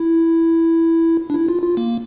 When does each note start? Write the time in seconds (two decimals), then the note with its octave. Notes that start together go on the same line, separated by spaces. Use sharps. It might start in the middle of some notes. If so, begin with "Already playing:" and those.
Already playing: E4
1.30 D4
1.34 E4
1.49 F4
1.63 F4
1.77 A#3